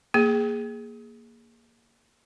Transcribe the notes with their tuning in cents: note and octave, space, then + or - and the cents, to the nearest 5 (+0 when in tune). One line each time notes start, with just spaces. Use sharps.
A#3 +0 G#4 +0